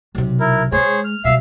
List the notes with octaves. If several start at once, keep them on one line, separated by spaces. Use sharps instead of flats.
B1 C3
E4 A#4
G#3 G#4 C5 C#5
F6
B2 G3 E5 F5